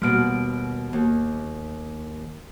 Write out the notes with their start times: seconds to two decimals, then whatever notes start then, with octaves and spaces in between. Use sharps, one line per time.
0.02 D#2 B2 G3 F#5 F6 D7
0.93 D#2